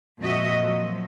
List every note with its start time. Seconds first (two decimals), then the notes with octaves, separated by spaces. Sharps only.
0.20 F2 A#2 F#4 D#5 E5
0.63 F3 F#3